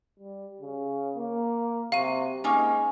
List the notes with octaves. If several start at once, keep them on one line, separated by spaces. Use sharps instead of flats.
G3
C#3
A#3
C3 F#3 F5 D#7
G#2 A#3 C#4 D#4